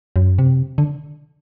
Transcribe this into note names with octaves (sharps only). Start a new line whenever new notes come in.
F#2
C3
D3